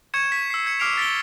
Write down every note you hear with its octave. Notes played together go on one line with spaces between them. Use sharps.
C#6 G#6 C#7 E7
B6
E6 C7
G#6 C#7
D6 F6 C7 D7 F7
A6 B6 D7 G7